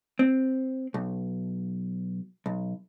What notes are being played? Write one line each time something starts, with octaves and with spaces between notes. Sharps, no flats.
C4
B1
B1